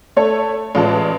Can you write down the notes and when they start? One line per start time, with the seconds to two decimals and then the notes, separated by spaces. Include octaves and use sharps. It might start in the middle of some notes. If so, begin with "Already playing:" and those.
0.16 A3 A4 C#5
0.75 A1 G#3 F4 B4 D5 A5